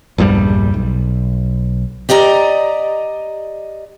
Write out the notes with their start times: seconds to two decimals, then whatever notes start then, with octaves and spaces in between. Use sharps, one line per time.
0.18 A#1 E2 G2 G3
0.74 B1
2.09 G4 D5 D#5 A5 A#5